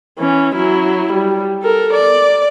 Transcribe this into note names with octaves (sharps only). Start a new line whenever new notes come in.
E3 C#4
F#3 E4
G3
A4 A#4
D5